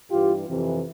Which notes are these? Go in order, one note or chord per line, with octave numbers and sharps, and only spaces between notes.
G2 E3 F4 G4
F2 C3 E3